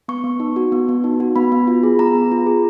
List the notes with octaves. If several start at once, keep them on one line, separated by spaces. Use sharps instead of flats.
B3 C#6
B3
D#4
F#4
B3
B3
D#4
F#4
B3 B5
B3
F4
G#4
B3 A#5
B3
F4
G#4